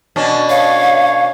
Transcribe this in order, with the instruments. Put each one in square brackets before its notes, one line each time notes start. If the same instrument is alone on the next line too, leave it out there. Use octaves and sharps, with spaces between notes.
[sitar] B2 C#4 D4
[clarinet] C#5 [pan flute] F5